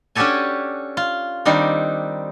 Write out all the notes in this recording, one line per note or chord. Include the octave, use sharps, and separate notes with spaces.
C#4 D4 F#4 G4 A4 G#5
F4
D#3 G3 C4 D4 D#4